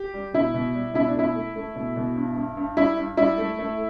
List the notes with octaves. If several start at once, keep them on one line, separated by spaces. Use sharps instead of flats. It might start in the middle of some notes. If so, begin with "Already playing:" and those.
Already playing: G4
G3
B2 E4
B2
G3
B2 E4
D4
A3 E4
A3
A3
B2
B2
G2
G2
G2
G3 E4
G2
G3 E4
A3
A3